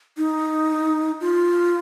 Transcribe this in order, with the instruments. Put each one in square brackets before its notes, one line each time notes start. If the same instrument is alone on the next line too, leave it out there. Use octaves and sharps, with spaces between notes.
[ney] D#4
F4